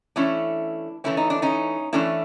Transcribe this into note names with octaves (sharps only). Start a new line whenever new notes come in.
E3 A3 C#4 D4 E4
E3 A3 C#4 E4
D#4
D4
C#4 D#4
E3 A3 C#4 D4 E4